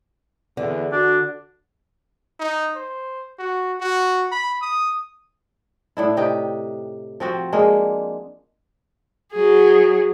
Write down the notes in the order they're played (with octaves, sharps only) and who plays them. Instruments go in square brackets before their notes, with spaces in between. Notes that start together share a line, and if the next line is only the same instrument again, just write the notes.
[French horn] E2 [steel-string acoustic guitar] D3
[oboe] D4 [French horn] F#4
[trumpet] D#4
C5
F#4
F#4
B5
D#6
[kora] A2 D4 E4
C3 D#4 G4
F3 C4 F#4
G#3 A#3 D4
[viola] F#3 G#4